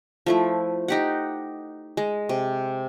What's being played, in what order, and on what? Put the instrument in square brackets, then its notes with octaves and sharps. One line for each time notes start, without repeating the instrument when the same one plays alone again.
[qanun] F3 A3 E4
D#4 G4 F#5
G#3
C3